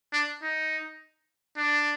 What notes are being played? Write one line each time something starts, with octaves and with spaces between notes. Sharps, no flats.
D4
D#4
D4